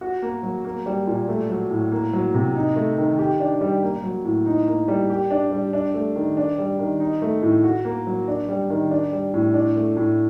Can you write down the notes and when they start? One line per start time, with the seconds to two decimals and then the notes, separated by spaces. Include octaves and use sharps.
0.01 F#4
0.22 A#3
0.43 F#3
0.65 A#3
0.86 G3
1.07 A#2
1.28 A3
1.49 F#3
1.71 A2
1.92 A#3
2.13 F#3
2.34 C3
2.55 D#4
2.76 A3
2.98 D#3
3.19 G4
3.40 D4
3.61 G3
3.83 A#3
4.04 F#3
4.25 A2
4.46 D#4
4.67 A#3
4.88 G3
5.10 G4
5.31 D4
5.51 G3
5.73 D4
5.94 A3
6.16 D#3
6.37 D4
6.58 G3
6.79 D#3
7.00 D#4
7.22 A3
7.42 A2
7.64 F#4
7.85 A#3
8.07 F#3
8.28 D4
8.49 G3
8.70 D#3
8.91 D4
9.12 G3
9.34 A2
9.54 D4
9.76 A3
9.96 A2